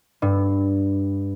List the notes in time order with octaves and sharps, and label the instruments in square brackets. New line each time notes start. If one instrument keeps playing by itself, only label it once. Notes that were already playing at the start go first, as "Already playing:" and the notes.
[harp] G2